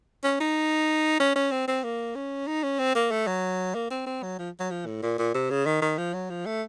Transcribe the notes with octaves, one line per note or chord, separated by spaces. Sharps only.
C#4
D#4
C#4
C#4
C4
C4
A#3
C#4
D#4
C#4
C4
A#3
A3
F#3
A#3
C4
C4
F#3
F3
F#3
F3
A2
A#2
A#2
C3
C#3
D#3
D#3
F3
F#3
F3
A3